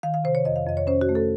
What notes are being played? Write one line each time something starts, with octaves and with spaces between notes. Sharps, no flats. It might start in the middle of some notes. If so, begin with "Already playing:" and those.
D#3 F5
F5
C3 C5
C#5
F2 D#5
F5
F2 D#5
C#5
C#4 C5
F#4
A3
A4